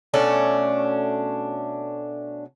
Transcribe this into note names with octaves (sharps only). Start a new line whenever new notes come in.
B2 A3 C#4 D4